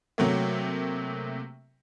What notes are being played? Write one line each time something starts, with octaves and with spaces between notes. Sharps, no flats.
C3 F#3 A3 A#3